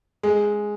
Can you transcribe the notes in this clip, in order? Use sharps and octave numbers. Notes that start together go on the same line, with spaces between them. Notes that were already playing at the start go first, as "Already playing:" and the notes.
G#3